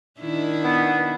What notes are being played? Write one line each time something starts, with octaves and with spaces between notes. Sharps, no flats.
D#3 D4 E4
B3